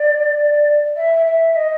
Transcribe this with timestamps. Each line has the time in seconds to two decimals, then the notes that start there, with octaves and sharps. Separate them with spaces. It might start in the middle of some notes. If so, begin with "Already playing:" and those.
Already playing: D5
0.96 E5
1.26 E5
1.56 D#5